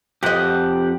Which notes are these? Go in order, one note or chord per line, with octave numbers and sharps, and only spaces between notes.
F2 G4 D#5 F#5